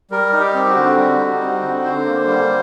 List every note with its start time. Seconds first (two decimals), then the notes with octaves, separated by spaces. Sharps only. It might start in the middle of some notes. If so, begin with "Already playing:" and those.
0.11 G3 A#4
0.33 D#4
0.40 G4
0.54 C4
0.63 D#4
0.69 F#4
0.76 D3
0.97 G3
1.19 D#4
1.41 C4
1.63 D3
1.84 D3 C5
2.06 A#3
2.27 G3